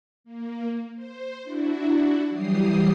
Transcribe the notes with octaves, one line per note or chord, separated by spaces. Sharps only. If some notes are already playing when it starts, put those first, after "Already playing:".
A#3
C5
D4 E4 F#4
E3 F#3 G3 G4 D#6 C7